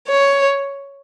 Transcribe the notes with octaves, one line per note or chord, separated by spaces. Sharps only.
C#5